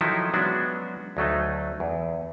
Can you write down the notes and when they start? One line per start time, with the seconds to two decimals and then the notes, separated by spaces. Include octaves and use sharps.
0.01 D#3 F3 F#3 D#4 E4 A4
0.34 F#3 G#3 B3 C#4 D4 F#4
1.17 D2 F#3 A3 D#4
1.80 E2